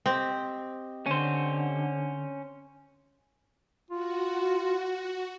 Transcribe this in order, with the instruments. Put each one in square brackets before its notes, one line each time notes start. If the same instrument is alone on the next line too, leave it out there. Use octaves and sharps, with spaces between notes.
[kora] C4 [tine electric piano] G4 D#5 G5
[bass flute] D3 [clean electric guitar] C#4 C5
[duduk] F4 [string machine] F#4